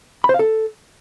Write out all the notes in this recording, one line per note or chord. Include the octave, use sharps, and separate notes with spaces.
B5
C5
F5
A4